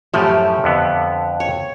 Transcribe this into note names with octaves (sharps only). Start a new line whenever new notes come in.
F#2 A2 F3 A3 G4
F2 D3 B3
C#5